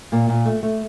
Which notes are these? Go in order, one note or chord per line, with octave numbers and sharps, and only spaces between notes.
A#2 A#3
A#2
A3
A3